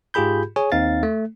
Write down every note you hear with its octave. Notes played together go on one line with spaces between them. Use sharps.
G#2 F4 G4 G#4 B5 G6
G#4 C#5 G#5
D#2 C4 D#4 F5 A6
A3